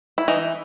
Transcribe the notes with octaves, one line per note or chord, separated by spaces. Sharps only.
E4
E3 D#4